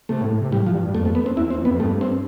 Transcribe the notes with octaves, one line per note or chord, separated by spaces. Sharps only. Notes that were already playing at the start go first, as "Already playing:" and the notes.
C3 A3
A2
A2
C3
A2 G3
F3
G2
G2
F2 A3
A3
B3
C4
E2 E4
C4
F2
B3
F2
G2 A3
C4